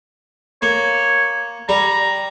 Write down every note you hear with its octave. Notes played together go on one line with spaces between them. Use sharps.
A#3 C#5
G3 A#5